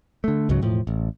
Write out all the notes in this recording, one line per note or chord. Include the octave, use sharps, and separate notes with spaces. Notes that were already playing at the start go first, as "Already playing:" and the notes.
D3 A3
C#2 G#2 C#3 F#3
E1 A2 F3
A1